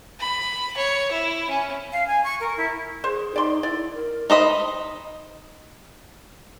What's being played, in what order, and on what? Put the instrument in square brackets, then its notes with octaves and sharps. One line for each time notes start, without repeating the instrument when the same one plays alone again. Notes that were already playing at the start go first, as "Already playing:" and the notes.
[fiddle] B5
C#5
E4
C#4
[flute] F5
G#5
C#6
A#4
E4
[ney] G#4 [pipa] C5
[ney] D#4 [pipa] D5 C6
[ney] E4 [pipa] D5
[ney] A#4
[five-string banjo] D#4 C5 D#5 B5